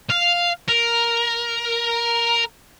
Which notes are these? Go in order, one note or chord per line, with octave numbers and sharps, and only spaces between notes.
F5
A#4